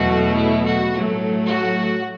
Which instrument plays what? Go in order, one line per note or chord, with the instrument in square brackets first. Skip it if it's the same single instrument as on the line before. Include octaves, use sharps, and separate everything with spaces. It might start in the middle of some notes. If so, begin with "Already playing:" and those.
Already playing: [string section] E2 B2 F#3 A3 F#4
E4
F#4
A2 F#3 A3
F#4